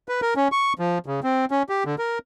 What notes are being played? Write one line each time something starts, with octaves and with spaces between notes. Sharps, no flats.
B4
A#4
C#4
C#6
F3
C#3
C4
C#4
G4
D3
A#4